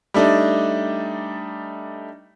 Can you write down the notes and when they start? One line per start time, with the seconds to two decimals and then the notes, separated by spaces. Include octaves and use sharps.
0.14 G3 A3 D4 D#4